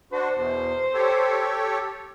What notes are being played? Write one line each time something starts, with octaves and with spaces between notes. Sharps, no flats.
D4 F#4 C5
E2 B2
G4 A4 C#5